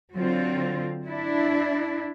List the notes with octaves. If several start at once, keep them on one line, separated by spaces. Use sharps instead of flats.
D3 F#3 C4 F4
D4 E4